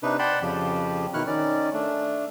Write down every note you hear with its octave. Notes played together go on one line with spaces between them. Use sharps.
C3 D4 D#4 B4
D5 F#5 G5 A5 B5 C6
F2 C#3 F3 G4
B2 D#3 E4 C#6 F6 F#6
D#3 C#4 D5
A3 D4